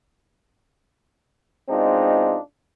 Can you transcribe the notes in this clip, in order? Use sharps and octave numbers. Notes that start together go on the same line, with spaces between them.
B2 G#3 C4 D4 D#4 F4